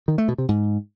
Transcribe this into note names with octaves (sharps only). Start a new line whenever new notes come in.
D#3
A3
B2
C3
G#2